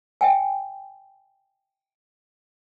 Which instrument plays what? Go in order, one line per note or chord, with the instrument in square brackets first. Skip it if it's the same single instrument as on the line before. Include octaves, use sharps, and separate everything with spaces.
[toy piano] E5 G5 G#5